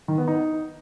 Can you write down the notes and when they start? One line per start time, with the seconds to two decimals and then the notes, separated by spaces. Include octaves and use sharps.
0.08 D#3
0.18 B3
0.28 D#4